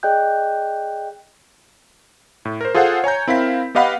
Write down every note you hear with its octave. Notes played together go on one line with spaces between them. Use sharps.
G#4 D5 D#5 G5 F#6 G6
A2
A#4 C5
F4 G#4 A4 C5 F5 F#5
C#5 G#5 A#5 G6
C4 E4 A#4 F5 B6
B3 G4 D#5 F5 F#5 B5